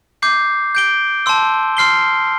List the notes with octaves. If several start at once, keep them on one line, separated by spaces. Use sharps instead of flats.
D6 G6 C7
G6 D7 G7
A5 C6 E6
C6 F6 C7 G7